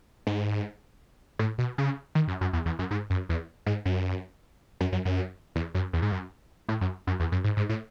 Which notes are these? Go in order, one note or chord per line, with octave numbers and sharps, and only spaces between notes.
G#2
A2
B2
C#3
D#3
F#2
F#2
E2
E2
F#2
G#2
F#2
E2
G#2
F#2
F#2
F#2
F#2
E2
F#2
E2
G#2
F#2
A2
F#2
F#2
E2
F#2
G#2
G#2
A2